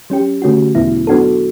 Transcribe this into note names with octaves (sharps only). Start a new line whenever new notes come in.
F#3 C#4 G4
D3 A3 C#4 F#4
E2 B2 F#3 B3 E4
F#3 B3 D4 F#4 A4